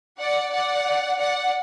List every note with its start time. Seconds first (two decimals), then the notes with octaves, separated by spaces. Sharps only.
0.19 D5 F#5
0.53 D5 F#5
1.19 D5 F#5